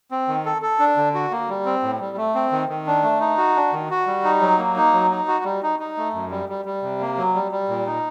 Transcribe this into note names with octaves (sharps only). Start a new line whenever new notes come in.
C4
D#3
A4
A4
D4
D3
F#4
A#3
G3
C4
A2
G3
A3
C4
D#3
D#3
D4
A3
D#4
F#4
D4
D#3
F#4
G3
D#4
F#3
A#3
D#4
F#3
D#4
F#4
G3
D#4
D#4
A3
F#2
G3
G3
G3
C3
A#3
F#3
G3
G3
A#2
D#4